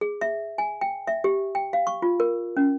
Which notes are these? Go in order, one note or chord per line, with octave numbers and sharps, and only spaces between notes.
G#4
E5
G#5
G5
E5
G4
G5
F5
C#6
F4
A#4
C#4